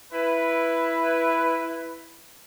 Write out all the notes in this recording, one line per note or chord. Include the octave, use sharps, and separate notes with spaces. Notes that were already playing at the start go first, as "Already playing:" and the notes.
E4 B4